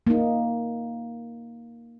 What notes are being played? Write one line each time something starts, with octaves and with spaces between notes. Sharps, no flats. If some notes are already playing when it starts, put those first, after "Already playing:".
A#3 D#4